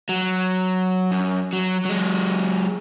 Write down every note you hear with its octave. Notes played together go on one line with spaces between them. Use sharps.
F#3
F#2
F#3
F#3 G#3